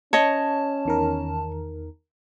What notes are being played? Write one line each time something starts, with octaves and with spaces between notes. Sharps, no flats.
C#4 C#5 D#5 A5
E2 D#3 A#4